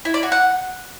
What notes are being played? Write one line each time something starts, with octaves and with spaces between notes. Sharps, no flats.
E4
D5
F#4
F#5